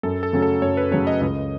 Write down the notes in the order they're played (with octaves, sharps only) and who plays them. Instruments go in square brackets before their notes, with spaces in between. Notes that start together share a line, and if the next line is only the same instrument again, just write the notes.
[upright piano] F#2 [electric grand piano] A4
[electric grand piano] A4
[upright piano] C#3 F#3 A3 C#4
[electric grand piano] A4
[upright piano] F#2 [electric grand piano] C#5
[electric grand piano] B4
[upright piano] C#3 F#3 A3 C#4 [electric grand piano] C#5
[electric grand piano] D#5
[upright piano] C#2 [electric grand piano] D#5